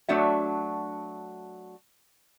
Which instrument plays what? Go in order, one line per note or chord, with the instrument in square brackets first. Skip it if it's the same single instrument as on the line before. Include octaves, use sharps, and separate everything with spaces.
[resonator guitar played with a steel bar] F#3 A3 D4 F#4 E5